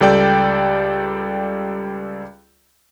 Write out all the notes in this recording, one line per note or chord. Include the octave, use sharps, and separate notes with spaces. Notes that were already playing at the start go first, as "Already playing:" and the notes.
C#2 G3 A4 D5 G5 G6